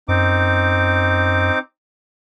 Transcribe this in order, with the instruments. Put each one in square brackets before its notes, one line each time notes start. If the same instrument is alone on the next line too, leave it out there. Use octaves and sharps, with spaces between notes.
[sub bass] F#2 [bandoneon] C4 D#4 D6